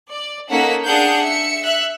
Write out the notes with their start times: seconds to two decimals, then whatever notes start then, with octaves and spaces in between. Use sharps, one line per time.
0.12 D5
0.49 A#3 C#4 D#4 A4 F#5 B6
0.86 D4 G#4 F5 F#5 G6
1.21 E5 C#7
1.62 E5 F#6